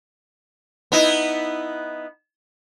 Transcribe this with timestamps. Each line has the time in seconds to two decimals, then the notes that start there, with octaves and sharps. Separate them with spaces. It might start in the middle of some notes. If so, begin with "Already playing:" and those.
0.92 B3 D#4 E4